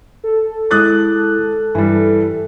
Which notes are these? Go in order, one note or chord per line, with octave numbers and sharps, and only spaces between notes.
A4
G#3 E4 D6 D#6 F#6 A6
G2 E3 G3